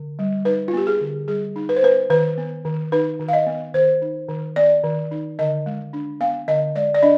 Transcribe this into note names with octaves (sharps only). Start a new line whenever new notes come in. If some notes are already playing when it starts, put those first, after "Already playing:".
Already playing: D3
G3
D#4 B4
F4
B3 G4
G#4
D3
G3 G#4
D#4
B4
C5
B3 B4
D#3 B4
B3
D#3
D#4 B4
D#3
F5
D#5
B3
D#3 C5
D#4
D#3
B3 D5
D#3
D#4
D3 D#5
G#3
D4
B3 F5
D3 D#5
G#3 D5
D5
D4 D#5